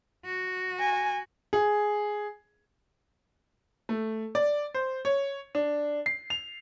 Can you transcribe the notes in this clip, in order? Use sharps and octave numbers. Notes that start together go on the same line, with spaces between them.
F#4
G#5
G#4
A3
D5
C5
C#5
D4
C7
F7